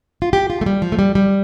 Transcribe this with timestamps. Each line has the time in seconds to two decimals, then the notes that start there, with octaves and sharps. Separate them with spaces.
0.22 F4
0.33 G4
0.50 F4
0.61 A3
0.66 G3
0.82 F3
0.92 A3
0.99 G3
1.15 G3